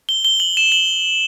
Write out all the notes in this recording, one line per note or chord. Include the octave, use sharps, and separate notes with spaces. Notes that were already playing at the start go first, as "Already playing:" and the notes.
G7
G7
F#7
E7
F#7